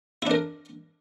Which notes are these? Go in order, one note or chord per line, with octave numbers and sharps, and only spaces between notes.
D4 E4 A#4